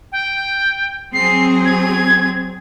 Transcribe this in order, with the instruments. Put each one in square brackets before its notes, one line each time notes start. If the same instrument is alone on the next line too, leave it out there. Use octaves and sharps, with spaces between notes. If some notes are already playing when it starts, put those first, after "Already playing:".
[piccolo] G5
[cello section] F#3 C4 G#4 [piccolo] C7
[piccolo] G#6